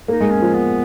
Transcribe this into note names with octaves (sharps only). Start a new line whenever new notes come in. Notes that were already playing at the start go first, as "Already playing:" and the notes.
A#3 D#4
G#3
C#4
F3
B3